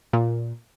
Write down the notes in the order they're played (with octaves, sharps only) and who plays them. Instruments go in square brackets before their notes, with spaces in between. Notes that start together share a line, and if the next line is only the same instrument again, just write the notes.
[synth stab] A#2